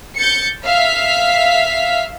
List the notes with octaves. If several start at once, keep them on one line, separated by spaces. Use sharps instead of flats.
G6 A6 C#7
E5 F5 F6 B6